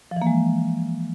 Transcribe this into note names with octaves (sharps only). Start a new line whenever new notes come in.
F3
E3
A#3
G#3